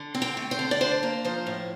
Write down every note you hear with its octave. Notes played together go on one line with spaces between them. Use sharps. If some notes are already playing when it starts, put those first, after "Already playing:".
Already playing: D3
C4
G5
A3
C5
D3
D5
D4 C5
A#3
F3 C5
A2